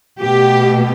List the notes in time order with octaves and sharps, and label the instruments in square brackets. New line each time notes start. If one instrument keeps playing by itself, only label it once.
[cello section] B2 A3 G4